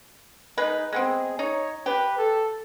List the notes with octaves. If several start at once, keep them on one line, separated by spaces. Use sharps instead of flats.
G#3 D#4 B4
G#3 B3 C4 G#4
D#4 C#5
G4 B4
A4